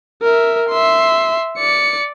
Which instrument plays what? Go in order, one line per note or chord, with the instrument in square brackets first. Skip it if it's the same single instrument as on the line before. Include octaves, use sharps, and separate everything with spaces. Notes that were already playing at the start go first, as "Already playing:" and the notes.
[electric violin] A#4 E5
E5 C6
D5 C#7